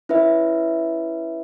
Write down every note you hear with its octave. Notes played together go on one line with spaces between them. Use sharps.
C#4 E4 B4 E5